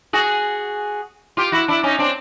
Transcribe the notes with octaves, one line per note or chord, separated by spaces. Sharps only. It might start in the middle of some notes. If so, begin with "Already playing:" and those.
F#4 G#4
F4 G4
E4 F#4
D4 E4
C#4 D#4
C4 D4